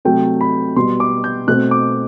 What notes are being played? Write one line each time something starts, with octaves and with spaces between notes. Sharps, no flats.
C3 F#3 A3 G5
B5
B2 G3 B3 C6
D6
G6
B2 A3 C4 F#6
D6